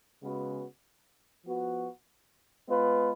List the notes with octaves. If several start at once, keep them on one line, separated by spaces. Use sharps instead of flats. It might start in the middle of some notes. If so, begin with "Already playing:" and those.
C#3 G#3 B3 F#4 B4
F3 B3 F#4 B4
G#3 B3 F4 B4